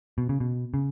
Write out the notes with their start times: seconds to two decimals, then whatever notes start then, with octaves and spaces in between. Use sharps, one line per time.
0.18 B2
0.29 C#3
0.40 B2
0.74 C#3